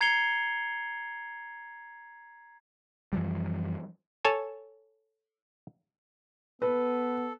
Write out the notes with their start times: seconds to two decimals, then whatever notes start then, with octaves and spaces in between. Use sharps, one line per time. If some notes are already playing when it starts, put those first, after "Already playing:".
0.01 A#5 G#6 C7 C#7 F7 G7
3.13 F#2 E3 F3 G3
4.25 A4 C#5 G#5 A5
6.62 B3 A4 B4